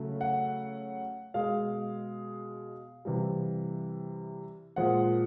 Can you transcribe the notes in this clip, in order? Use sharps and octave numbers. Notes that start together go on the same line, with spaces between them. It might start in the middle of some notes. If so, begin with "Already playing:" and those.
Already playing: C#3 F#3 A3
F#5
B2 G#3 F5
C3 E3 G3
A#2 F3 G#3 F#5